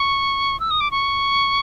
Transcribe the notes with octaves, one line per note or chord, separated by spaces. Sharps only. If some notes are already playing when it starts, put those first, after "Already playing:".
Already playing: C#6
E6
D#6
D6
C#6